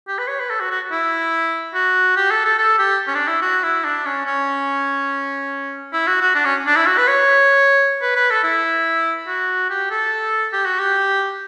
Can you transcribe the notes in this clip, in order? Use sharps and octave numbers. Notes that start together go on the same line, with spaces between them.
G4
B4
C#5
B4
A4
F#4
F#4
E4
F#4
G4
A4
A4
A4
G4
C#4
D4
E4
F#4
E4
D4
C#4
C#4
E4
F#4
F#4
D4
C#4
D4
E4
F#4
B4
C#5
B4
B4
A4
E4
F#4
G4
A4
G4
F#4
G4